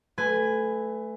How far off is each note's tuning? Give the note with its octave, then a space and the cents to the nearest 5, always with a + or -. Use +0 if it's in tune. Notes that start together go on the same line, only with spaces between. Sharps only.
A3 -5 B4 +20 G#5 -5